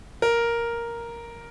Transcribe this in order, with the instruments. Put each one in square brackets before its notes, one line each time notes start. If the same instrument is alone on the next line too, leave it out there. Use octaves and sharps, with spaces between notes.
[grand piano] A#4